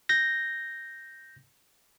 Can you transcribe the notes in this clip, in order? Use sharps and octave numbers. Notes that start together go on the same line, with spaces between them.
G6 A#6